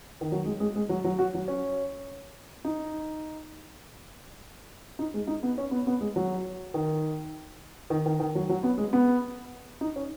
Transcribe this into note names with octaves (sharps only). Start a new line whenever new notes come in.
D#3
F#3
G#3
G#3
G#3
F#3
F#3
F#4
F#3
C#4
D#4
D#4
G#3
D#4
B3
C#4
B3
B3
G#3
F#3
D#3
D#3
D#3
D#3
F#3
F#3
B3
G#3
B3
D#4
C#4